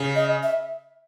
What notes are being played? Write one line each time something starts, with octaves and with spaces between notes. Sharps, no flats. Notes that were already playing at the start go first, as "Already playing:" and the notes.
Already playing: C#3
D#5
E5